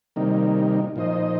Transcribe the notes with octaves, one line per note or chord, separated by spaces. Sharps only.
C3 D#3 G3 A#3 D#4
A#2 F3 D#4 C5 D#5